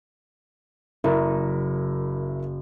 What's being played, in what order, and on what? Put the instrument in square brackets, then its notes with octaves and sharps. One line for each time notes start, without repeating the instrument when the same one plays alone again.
[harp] F#1 [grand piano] E4 A#4